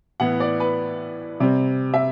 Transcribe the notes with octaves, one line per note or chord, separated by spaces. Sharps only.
A2 E3 B3 F#5
D5
B4
C3 G3 C4
E5